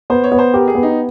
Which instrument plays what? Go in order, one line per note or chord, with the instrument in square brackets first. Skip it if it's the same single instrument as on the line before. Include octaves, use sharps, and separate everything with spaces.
[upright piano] B3 [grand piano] C5
[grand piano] C#5
[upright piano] B3
[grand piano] C5
[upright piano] G4 [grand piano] A#4
[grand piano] G#4
[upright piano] B3
[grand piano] D#4